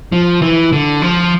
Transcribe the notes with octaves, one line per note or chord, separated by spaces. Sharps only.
F3
E3
D3
F3